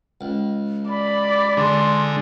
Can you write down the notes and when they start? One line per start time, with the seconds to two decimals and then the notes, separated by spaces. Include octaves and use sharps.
0.21 C#2
0.89 D5 B5
1.57 D3 G#3 C6